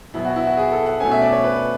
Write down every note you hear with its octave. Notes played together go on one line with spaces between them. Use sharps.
B2 F#3 B3 E4
F#4
E4
F#4
G#4
A4
F#5
B2 A3 C#4 G#5
E5
D5
C#5
B4